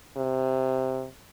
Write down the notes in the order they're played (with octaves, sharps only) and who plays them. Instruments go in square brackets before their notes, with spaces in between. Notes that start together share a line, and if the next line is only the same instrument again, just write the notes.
[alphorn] C3